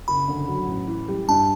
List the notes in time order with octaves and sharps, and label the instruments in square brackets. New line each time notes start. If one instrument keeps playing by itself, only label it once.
[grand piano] F#1 [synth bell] B5
[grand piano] D3
F#3
A1
E3
G3
[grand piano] G2 [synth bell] A5